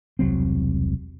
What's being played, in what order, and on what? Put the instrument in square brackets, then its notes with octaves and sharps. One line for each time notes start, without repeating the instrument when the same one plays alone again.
[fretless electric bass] E1 C2 F#3 C4